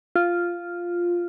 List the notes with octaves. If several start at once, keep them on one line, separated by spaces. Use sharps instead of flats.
F4